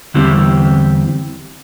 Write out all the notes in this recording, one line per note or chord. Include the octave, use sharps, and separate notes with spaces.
E2 D3 G3 C4 E4 G4